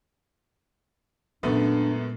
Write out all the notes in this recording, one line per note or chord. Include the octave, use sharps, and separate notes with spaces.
F#2 A#2 G#3 A3 B3 D4